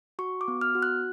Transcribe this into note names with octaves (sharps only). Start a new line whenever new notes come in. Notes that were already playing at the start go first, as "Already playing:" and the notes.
F#4 C#6
D6
B3
F6
F#4
F#6